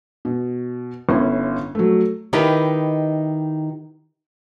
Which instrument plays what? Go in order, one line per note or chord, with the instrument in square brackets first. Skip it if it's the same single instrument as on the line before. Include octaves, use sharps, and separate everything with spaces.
[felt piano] B2
G1 C#4 E4
F#3 A3
[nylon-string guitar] D#3 D#4 E4 G4 B4 D#5